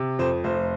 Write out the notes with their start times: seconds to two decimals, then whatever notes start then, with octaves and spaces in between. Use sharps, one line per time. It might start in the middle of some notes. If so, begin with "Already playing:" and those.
Already playing: C3
0.19 F2 C5
0.44 F1 C5